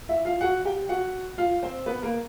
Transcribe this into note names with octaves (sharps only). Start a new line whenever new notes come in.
E4 E5
F4 F5
F#4 F#5
G4 G5
F#4 F#5
F4 F5
C4 C5
B3 B4
A#3 A#4